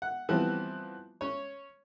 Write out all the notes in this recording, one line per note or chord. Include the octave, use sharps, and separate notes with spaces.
F#5
E3 F3 G3 B3 C4
C#4 C#5